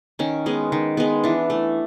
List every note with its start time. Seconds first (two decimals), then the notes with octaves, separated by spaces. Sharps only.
0.19 D#3 C#4
0.46 G#3 B3
0.72 D#3
0.97 G#3 B3
1.24 E3 D4
1.50 A3